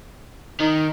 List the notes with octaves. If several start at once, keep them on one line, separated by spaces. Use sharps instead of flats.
D#3 D#4